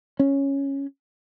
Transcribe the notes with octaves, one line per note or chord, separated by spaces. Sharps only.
C#4